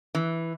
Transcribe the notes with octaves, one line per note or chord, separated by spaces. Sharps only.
E3